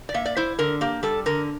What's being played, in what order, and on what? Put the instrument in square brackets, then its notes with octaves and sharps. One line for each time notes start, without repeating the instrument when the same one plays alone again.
[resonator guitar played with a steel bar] D5
A#3 E5
D5
E4 C5
D3 A#4
A#3 G4
G3 A4
D3 A#4